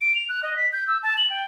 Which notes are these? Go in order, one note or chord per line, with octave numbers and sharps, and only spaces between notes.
D7
F7
F#6
D#5
B6
G6
E6
A5
F#7
G5